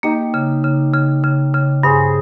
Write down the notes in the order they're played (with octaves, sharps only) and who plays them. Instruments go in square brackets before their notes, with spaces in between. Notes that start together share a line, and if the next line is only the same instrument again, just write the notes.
[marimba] A#3 [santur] D#4 G4
[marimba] C#3
C#3
C#3
C#3
C#3
[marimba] G2 [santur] G#4 C5